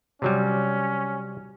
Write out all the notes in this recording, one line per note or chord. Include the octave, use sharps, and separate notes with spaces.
C3 F#3 G3 C#4